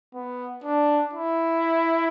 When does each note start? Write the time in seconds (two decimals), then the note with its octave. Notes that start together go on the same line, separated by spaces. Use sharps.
0.14 B3
0.64 D4
1.13 E4